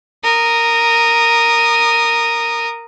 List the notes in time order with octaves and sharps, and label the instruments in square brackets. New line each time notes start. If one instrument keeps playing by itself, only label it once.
[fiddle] A#4 D#6